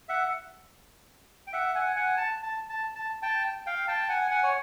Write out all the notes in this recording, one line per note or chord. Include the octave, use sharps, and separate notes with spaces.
E5 F#5
G5
E5 F#5
F#5 G#5
F#5 G#5
A5
A5
A5
A5
G5 A5
F5 G5
G5 A5
F#5 G#5
F#5 G#5
C#5